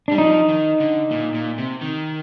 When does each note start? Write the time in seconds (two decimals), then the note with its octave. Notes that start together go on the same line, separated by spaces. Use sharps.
0.08 G3 D4
0.18 F3 D#4
0.49 D#3
0.80 D3
1.11 A#2
1.34 A#2
1.58 C3
1.81 D#3